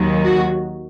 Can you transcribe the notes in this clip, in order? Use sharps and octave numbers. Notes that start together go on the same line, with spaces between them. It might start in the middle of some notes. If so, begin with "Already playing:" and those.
Already playing: D#2 D#3 F#3
F#4